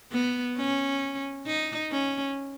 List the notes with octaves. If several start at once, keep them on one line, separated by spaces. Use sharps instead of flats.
B3
C#4
D#4
C#4